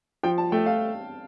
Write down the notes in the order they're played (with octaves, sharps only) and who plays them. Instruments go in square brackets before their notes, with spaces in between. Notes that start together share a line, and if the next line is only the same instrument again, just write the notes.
[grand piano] F3 [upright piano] G5
[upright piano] A5
[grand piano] A3 [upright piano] G5
[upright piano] F5